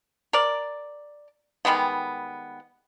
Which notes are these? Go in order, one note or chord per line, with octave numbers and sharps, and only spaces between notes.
A#4 D5
D#3 G3 G#3 B3